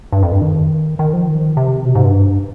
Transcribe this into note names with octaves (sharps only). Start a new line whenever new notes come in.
G2
F2
G2
D#3
D#3
F3
D#3
C3
B2
G#2
G2